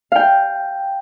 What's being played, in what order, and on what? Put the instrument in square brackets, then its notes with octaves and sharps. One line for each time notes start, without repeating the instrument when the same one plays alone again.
[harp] F5 G5